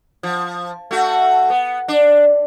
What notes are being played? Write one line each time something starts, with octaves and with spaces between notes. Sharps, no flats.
F3
A3 F#4
B3
D4